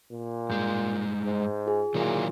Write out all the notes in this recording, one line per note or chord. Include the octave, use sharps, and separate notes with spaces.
A#2
G2 G#3 G6
G#2
F4 G#4 G#5
A#2 D#3 F#3 E4